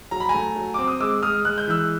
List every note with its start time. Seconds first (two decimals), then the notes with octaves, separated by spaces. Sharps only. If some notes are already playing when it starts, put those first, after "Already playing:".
0.11 F#3 A#5
0.20 B5
0.29 G#5 A#5
0.34 A3
0.56 F#3
0.74 C4 D6
0.87 D#6
1.00 G#3 D6 E6
1.22 G#3 D#6 F6
1.45 G#3 F#6
1.58 G6
1.68 E3 E6 F#6